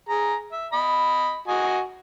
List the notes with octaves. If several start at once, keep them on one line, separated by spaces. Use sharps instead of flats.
G#4 A#5
E5
D#5 B5
F#4 D#5 G#5